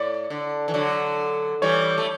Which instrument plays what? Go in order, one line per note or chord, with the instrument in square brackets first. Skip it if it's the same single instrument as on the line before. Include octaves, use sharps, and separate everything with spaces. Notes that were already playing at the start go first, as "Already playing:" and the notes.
Already playing: [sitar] A2 [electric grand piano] D5
[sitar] D3
E3
D3 F#3
[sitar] E3 G3 [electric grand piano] C#5
[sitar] A3